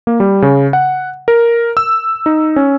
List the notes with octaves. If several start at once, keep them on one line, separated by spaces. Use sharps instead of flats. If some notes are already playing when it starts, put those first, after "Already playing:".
A#3
G3
C#3
F#5
A#4
E6
D#4
C#4